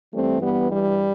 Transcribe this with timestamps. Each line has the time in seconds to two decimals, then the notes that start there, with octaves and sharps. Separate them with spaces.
0.13 G2 E3 G3 A3 C4
0.41 G3 B3
0.69 G3